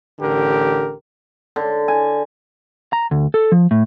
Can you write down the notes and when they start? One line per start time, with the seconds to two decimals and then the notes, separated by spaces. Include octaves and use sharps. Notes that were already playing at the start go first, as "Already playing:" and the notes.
0.20 A1 D3 G4 A#4
1.56 D3
1.88 G#5
2.93 A#5
3.11 D2
3.34 A4
3.52 F3
3.71 A2